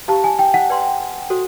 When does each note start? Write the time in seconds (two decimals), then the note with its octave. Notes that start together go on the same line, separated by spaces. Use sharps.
0.08 G4 C5 F5 A5 A#5 C#6
0.24 G#5
0.39 G5
0.54 F#5
0.70 B4 D5 G5 C6
1.30 F#4 A4 C5